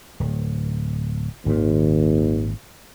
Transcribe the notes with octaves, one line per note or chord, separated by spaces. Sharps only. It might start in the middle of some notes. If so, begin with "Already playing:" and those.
D1
G#1 D#2 A#2